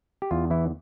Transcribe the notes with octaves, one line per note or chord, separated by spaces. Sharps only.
G4
E2 F4
E3 E4